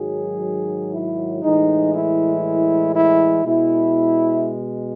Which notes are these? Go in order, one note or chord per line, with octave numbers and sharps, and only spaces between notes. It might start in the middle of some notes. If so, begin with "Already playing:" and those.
Already playing: G#2 D#3 F#3 G#4
E4
A2 E3 G#3 D#4
E4
E4
B2 G#3 E4